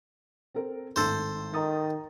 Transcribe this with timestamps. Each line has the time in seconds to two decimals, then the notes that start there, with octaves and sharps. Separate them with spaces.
0.55 C4 A4 A#4
0.96 G#1 A2 D#3 A4 C5
1.54 D#3 A#5 D#6 A6